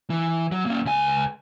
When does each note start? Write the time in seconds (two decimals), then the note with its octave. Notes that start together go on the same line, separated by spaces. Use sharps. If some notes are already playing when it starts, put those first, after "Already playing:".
0.10 E3
0.52 F#3
0.66 A#3 C#4
0.85 C#2 G#5